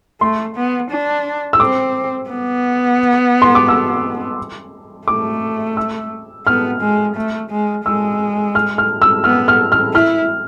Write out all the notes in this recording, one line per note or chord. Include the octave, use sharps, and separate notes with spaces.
A3 C6
B3
D4
E6
C4 D6
B3
C6
D6
E6
A3 D6
E6
B3 F6
G#3
A3
G#3
G#3 E6
F6
F6
E6
B3 F6
F6
F6
E4 F6